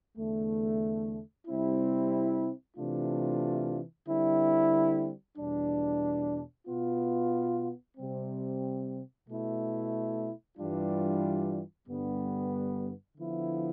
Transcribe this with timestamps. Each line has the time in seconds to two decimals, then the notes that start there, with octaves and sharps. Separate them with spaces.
0.17 E2 D3 A3
1.47 C3 G3 C4 E4
2.77 C3 E3 A3 D4 F4
4.07 D3 G3 C4 E4
5.37 E2 B2 G3 D4
6.67 B2 B3 F4
7.97 C3 G3 C4
9.27 B2 A3 E4
10.58 G2 E3 G3 D4 F4
11.88 G2 D3 G3 B3
13.17 D3 F3 B3 E4